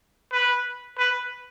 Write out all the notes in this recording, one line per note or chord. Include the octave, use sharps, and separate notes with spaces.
B4
B4